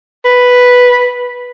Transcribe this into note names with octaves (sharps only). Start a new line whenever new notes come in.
B4